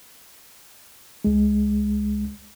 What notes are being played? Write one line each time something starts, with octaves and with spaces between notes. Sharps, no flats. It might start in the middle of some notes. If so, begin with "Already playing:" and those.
C#2 G#3